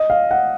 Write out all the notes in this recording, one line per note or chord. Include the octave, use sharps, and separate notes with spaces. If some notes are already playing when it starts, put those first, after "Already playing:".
Already playing: D#5
F5
F#5